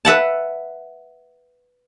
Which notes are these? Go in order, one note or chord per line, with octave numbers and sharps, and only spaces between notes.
B4 E5 F#5 A5